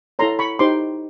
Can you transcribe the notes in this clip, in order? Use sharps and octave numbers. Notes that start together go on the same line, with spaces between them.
E4 A4 C#5 A#5 C6
B5 C#6
D#4 G4 C5 C6 D6